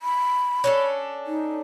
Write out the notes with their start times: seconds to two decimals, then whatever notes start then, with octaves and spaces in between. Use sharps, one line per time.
0.02 B5
0.64 C#4 D4 A4
1.27 D#4